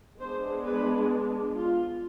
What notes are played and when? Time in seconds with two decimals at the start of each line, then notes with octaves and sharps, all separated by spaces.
0.19 G#3 B3 D4 C5
0.64 B4
1.55 F4